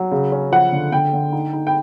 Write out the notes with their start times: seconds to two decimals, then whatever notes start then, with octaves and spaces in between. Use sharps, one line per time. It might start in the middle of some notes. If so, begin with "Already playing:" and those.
Already playing: F#3
0.11 C#3
0.32 C#4
0.52 F3 F#5
0.72 D3
0.92 D3 G5
1.13 D3
1.32 D#4
1.53 D#4
1.67 G5